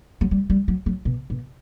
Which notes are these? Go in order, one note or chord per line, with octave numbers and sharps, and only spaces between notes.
F#3
G3
G3
F#3
F#3
B2
B2